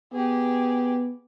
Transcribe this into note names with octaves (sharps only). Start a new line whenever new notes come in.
B3 G4 G#4